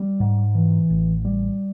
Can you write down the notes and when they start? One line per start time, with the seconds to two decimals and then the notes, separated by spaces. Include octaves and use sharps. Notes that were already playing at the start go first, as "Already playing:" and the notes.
Already playing: G3
0.20 G#2
0.55 E3
0.90 A1
1.25 G3